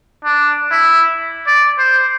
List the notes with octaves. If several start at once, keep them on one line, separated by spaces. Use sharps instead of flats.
D4
E4
D5
C5